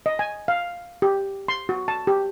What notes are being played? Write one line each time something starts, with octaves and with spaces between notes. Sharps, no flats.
D#5
G#5
F5
G4
C6
F#4
A5
G4